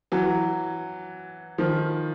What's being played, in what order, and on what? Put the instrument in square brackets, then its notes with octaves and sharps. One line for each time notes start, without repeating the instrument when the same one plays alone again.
[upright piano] E3 F#3
D#3 F3